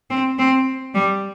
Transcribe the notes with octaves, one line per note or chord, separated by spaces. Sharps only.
C4
C4
G3